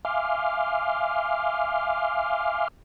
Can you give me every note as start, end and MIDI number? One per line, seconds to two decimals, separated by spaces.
0.05 2.68 76
0.05 2.68 77
0.05 2.68 80
0.05 2.68 84
0.05 2.68 86
0.05 2.68 89